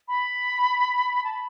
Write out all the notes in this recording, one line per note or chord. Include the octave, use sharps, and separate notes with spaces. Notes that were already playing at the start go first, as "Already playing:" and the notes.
B5
A5
B5